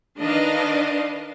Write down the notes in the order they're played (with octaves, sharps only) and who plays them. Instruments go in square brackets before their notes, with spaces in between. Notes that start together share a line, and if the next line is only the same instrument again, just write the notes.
[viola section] D#3 D4 B4 D#5 F5